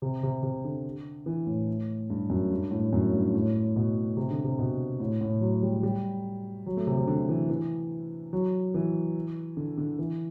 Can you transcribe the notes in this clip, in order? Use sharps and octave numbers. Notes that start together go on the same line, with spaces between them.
C3
C3
C3
D3
E3
A2
G2
F#2
G2
A2
F#2
G2
A2
B2
C3
D3
C3
B2
A2
A2
F#3
G3
G3
F#3
A3
C3
C3
D3
E3
E3
F#3
E3
D3
D3
E3